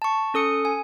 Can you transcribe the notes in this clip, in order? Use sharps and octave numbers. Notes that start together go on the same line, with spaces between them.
A5 C#6
C#4 A4 D#6 C#7
G#5